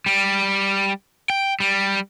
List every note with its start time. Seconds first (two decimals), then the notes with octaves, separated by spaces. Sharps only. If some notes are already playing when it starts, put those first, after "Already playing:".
0.06 G3
1.30 G5
1.60 G3